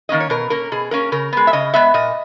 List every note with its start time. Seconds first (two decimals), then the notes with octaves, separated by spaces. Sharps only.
0.09 D#3 A#3 C#4 D#5
0.20 C#5
0.30 B2 A#4
0.50 A#3 C#4 A#4
0.72 B2 G#4
0.91 A#3 C#4 A#4
1.12 C#3 A#4
1.33 G#3 B3
1.47 E5
1.53 C#3 D#5
1.74 G#3 B3 E5
1.94 A#2 D#5